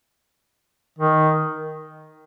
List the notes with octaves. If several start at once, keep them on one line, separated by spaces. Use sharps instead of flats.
D#3